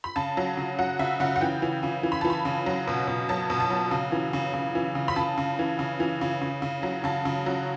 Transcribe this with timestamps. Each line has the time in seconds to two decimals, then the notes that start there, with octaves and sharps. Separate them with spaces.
0.04 B5
0.16 C#3 A5
0.37 F#3
0.57 C#3
0.79 F#3 F#5
0.99 C#3 E5
1.20 C#3 F#5
1.36 F#5
1.41 E3 G5
1.62 E3
1.83 C#3
2.03 E3
2.12 B5
2.21 E3 A5
2.30 B5
2.45 C#3
2.66 F#3
2.88 B2
3.07 B2
3.29 F#3 A5
3.50 B2
3.60 A5
3.70 F#3
3.91 C#3
4.12 E3
4.33 C#3
4.54 C#3
4.75 E3
4.95 C#3
5.08 B5
5.16 C#3 A5
5.38 C#3
5.59 E3
5.79 C#3
6.00 E3
6.21 C#3
6.41 C#3
6.62 C#3
6.83 F#3
7.04 C#3 A5
7.25 C#3
7.46 F#3